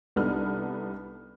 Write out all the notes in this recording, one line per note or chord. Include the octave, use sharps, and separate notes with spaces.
C2 B3 D4 D#4 A4 F6